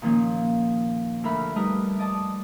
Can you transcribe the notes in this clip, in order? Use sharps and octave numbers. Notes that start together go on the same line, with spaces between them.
A#2 D#3 F3 A#3 C#4
D2 A#4 E5 B5 F6
G3 A3 D#4 A#4 B4 D#5
D5 D#5 A5 D#6